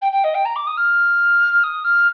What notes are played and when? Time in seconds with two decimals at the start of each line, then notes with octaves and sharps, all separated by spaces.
0.01 G5
0.12 G5
0.23 D#5
0.34 G5
0.45 A#5
0.55 D6
0.66 D#6
0.76 F6
1.63 D#6
1.84 F6